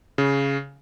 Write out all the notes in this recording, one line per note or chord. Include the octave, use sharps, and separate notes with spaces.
C#3